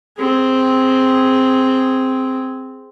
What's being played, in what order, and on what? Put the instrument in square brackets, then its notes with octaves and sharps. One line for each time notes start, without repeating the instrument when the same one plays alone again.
[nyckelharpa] C4 G#4